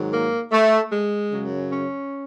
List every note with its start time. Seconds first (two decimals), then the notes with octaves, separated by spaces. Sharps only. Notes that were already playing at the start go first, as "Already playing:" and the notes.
Already playing: G#2 D#3 F#3
0.12 A#3
0.52 A3
0.91 G#3
1.32 F#2 C#3 F#3
1.71 C#4